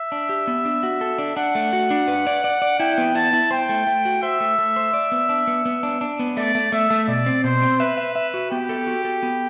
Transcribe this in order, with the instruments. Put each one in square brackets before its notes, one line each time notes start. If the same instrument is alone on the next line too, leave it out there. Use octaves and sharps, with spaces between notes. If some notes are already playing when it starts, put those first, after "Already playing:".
Already playing: [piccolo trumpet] E5
[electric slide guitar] D4
G4
B3
D4
F#4
A4
D4
[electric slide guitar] D4 [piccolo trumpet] F#5
[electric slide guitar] A3
F#4
D4
B4
D5
D5
D5
[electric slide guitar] E4 [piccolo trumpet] G5
[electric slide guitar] B3
[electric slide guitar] E4 [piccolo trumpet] A5
[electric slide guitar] E4
[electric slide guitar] C5 [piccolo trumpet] G5
[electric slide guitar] A3
A3
F#4
[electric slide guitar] C5 [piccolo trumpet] E5
[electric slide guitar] A3
A3
C5
D5
B3
D4
B3
B3
D4
D4
B3
[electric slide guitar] A3 [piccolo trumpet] D5
[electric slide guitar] A3
[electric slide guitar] A3 [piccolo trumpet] E5
[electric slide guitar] A3
[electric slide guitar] B2 [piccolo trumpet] D5
[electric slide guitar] C4
[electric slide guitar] B2 [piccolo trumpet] C5
[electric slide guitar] C4
[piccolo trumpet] B4 [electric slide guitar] E5
[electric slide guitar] E5
E5
F#4
[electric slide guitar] B3 [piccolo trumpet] G4
[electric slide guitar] A4
F#4
A4
B3